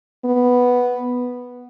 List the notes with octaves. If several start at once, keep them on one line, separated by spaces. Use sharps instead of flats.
B3